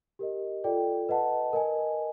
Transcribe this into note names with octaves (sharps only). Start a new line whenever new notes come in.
G4 A#4 D#5
F4 A4 D5 G5
B4 D#5 F#5 A5
A#4 D#5 G#5